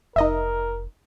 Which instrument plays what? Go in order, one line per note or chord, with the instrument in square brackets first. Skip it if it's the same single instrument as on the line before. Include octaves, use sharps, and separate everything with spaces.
[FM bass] F1 [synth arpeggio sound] D#4 D#5 E5 [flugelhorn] A#4